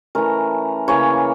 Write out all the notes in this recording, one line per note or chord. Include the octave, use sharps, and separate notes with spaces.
E3 A3 C#4 A#4
C#3 E3 A#3 C#4 C#5